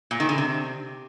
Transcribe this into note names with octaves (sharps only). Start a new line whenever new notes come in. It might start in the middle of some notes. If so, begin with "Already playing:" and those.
A#2
D#3
D3
C3